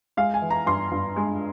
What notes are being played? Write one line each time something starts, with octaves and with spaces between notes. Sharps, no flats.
G#3 F5
G#5
E3
A#5
G2 C6
G2
G#3